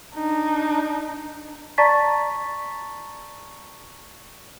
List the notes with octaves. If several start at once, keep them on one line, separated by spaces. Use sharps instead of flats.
D4 D#4
D5 A5 A#5 C#6 A6 B6